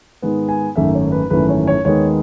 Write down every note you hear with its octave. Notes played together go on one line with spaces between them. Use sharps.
G#2 D#3 G#3 B3
G#5
G#1 F#2 D#3 A3 C#4 E5
C#5
B4
G#1 F#2 E3 A3 C#4 B4
C#5
C#5
D#2 D#3 G#3 B3 C#5